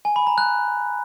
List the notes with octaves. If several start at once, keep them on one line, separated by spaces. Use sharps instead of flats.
G#5
B5
A#5
F#6